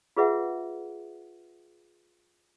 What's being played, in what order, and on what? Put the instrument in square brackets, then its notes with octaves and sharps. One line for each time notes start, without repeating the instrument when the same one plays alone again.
[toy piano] F4 G#4 B4 E5 F#5